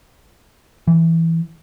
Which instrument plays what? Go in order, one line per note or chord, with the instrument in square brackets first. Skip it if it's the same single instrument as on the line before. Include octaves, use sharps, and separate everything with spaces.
[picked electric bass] E3